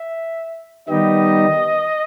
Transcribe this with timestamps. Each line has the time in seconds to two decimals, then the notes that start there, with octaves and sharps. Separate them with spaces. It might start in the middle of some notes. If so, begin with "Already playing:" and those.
Already playing: E5
0.89 D#3 G3 B3 D#4 G4 D#5